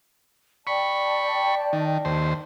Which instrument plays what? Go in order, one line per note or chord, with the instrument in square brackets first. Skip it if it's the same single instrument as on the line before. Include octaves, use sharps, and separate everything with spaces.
[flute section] D5 G5 A5 [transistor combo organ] B5 C#6
[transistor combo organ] D#3
D#2 C5